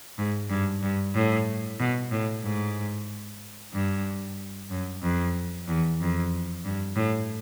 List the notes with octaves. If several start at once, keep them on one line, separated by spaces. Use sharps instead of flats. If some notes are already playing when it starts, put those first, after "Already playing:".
G#2
G2
G2
A2
B2
A2
G#2
G2
F#2
F2
E2
F2
G2
A2